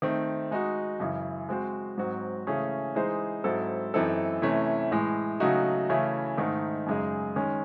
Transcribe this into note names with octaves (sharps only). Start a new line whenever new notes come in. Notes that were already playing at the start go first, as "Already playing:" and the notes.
D#3 A3 C4
G#3 D#4 F#4
F#2 C#3 E3
G#3 C4 F#4 C5
G#2 F#3 C4 F#4
C#3 E3 A3 C#4 G#4
E3 G#3 D#4 G#4 C5
G#2 F#3 C4 E4 A4
F#2 E3 C4 D#4 A4
C3 E3 A3 C#4
A2 E3 G#3
C#3 F#3 A3 D#4 F#4
C#3 E3 A3 C#4 E4
G#2 D#3 A3
F#2 C#3 G#3 D#4 G#4
D#3 G#3 C#4